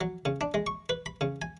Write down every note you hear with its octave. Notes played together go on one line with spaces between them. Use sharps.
F#3
C#3
D4
G#3
C#6
B4
B5
C#3
G#5